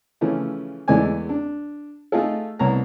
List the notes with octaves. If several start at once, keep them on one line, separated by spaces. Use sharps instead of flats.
C#3 E3 F3 A3 C#4
E2 E3 G#3 A3 D5 G#5
D4
A3 D#4 F4 G#4 A4
C2 B3 C#5 A5 A#5